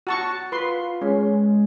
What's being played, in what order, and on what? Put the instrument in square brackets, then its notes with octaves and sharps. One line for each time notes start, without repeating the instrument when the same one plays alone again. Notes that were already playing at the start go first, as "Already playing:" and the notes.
[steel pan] F#4 A5 C#6
[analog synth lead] F4 [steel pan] B4 C6
[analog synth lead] G#3 [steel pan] C#4